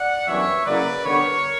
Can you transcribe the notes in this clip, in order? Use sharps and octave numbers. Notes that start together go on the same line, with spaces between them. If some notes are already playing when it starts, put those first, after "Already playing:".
Already playing: D5 F#5
F#2 E3 G3 B3 D4 C#5 E5
C#3 F#3 A#3 C#4 E4 B4 D5
D3 G3 B3 A#4 C#5